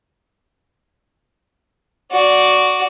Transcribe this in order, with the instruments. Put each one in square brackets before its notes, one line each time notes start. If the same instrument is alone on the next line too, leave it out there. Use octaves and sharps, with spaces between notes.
[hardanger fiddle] F#4 D5